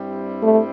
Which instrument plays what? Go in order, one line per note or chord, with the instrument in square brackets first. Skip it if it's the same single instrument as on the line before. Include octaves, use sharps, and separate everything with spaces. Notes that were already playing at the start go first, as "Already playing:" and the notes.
Already playing: [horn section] G2 G3 C4 E4
[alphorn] A3